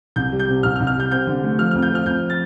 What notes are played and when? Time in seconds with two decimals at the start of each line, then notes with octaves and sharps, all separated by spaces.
0.16 C2 G6
0.32 G3
0.39 G6
0.48 C3
0.63 C2 F6
0.76 F6
0.80 C2
0.87 F6
0.96 G3 G6
1.11 C4 G6
1.27 D3
1.43 A3
1.58 F3 F6
1.71 F2 F6
1.82 G6
1.91 F3 F6
2.06 F2 G6
2.30 A6